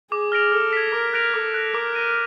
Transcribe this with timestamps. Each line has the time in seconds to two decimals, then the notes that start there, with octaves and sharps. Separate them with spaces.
0.11 G#4 D6
0.32 F6 A#6 D7 F7
0.52 A4 F6
0.73 G#6 B6
0.93 A#4 D6
1.13 F#6 A#6 D7 F7
1.34 A4 D6
1.54 F#6 A#6
1.74 A#4 D6
1.95 F6 A#6 D#7